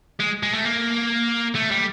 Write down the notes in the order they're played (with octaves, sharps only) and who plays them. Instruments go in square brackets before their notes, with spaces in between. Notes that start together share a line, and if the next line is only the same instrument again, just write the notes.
[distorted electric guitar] G#3
G#3
A3
A#3
A3
G3